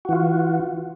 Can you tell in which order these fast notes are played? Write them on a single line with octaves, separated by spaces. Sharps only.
F#4 E3 F4